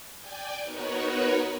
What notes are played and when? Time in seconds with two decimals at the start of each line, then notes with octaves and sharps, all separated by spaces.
0.17 D5 G5 G#5
0.62 B3 D#4 F#4 A#4 B4 C#5